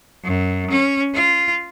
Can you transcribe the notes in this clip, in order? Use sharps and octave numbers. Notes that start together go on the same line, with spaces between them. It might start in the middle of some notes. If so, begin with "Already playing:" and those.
F#2
C#4
F4